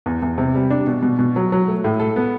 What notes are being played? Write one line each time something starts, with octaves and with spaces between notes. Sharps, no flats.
E2
E2
C3
G3
D4
B2
B2
B2
F#3
F#3
A3
A2
A4
B3